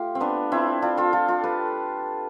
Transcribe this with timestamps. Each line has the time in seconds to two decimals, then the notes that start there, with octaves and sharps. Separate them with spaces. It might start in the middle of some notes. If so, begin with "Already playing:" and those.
Already playing: A3 F4 G4
0.15 C4
0.20 B3 D4
0.52 C4 E4
0.82 D4 F4
0.97 F4 A4
1.13 F4 A4
1.28 F4 A4
1.44 G4 B4